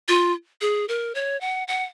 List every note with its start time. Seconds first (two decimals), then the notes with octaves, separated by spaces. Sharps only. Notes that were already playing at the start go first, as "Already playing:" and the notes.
0.08 F4
0.61 G#4
0.89 A#4
1.15 C#5
1.41 F#5
1.68 F#5